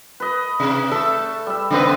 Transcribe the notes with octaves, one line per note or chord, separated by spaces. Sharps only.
B4 D#5
C3
A3 A4 E5
G3 E5
C#3 G3 B3 C4 B4